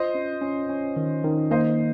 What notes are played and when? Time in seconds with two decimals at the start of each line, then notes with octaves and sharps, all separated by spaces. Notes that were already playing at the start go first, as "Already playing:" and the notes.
Already playing: F4 C5 D#5
0.15 C#4
0.41 C#4
0.69 C#4
0.96 D#3
1.24 D#3
1.51 A#3 C5 D#5